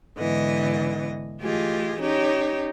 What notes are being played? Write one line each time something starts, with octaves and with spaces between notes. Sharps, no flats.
G#2 D3 E3 B3 D#5
E3 A3 F4 G4 G#4 D#5
C#4 D#4 G4 C#5